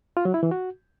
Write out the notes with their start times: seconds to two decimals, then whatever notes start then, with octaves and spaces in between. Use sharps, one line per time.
0.17 F4
0.25 F#3
0.34 E4
0.43 E3
0.51 F#4